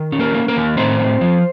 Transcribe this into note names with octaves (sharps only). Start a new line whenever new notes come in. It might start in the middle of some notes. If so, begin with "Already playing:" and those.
Already playing: D#3
C#4
A#3 A#4
A#3
A#3 A#4
D#3
A2 C4 C5
C4
F3